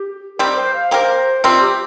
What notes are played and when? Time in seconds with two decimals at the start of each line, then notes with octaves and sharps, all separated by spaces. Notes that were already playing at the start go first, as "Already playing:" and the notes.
Already playing: G4
0.39 G3 C4 G4 A#4
0.56 C5
0.74 F5
0.91 A#3 G4 A#4 C5
1.44 C3 G3 C4 F4
1.61 G4